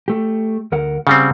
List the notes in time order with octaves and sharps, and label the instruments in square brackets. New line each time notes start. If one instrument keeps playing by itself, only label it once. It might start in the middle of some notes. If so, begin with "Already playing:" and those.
[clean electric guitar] A3 G4
D2 A#4 F#5
[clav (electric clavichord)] C#3 G3 C4 [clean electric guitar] F#5